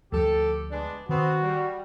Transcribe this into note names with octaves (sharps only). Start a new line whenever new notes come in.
D2 F3 G3 G4 A4
G#3 B3 D4
D#3 B3 C4 F#4
G3